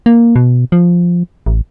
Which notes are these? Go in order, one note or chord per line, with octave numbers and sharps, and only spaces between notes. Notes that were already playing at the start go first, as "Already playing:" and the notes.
A#3
B2
F3
A1